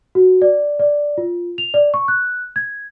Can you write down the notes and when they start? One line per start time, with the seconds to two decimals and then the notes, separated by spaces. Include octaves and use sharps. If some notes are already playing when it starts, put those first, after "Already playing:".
0.15 F#4
0.42 D5
0.79 D5
1.18 F4
1.58 F7
1.74 D5
1.94 C#6
2.08 F#6
2.56 G#6